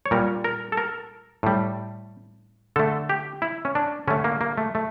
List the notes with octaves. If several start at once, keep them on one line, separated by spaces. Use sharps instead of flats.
C#5
A#2 G3 A#4
A#4
A4
A#4
A2 G3
D3 A3 A4
G4
E4
C#4
D4
D3 A3 C#4
A#3
A#3
A3
A3